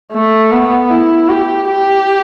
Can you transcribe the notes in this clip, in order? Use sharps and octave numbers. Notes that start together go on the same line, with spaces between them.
A3
B3
E4
G4
G4